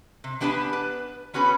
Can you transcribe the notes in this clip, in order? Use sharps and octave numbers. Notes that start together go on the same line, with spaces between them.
C3
B3 D4 G4 B4 F5 G#5
B4
B3 C#4 F#4 G#4 B4